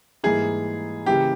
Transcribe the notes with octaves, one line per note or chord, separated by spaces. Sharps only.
G#2 E3 G3 A#3 E4 G#4
C#3 E3 A#3 E4 G4